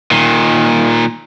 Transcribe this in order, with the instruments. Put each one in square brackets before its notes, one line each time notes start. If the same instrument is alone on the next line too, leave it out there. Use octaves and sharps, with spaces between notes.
[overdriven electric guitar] A#2 D#3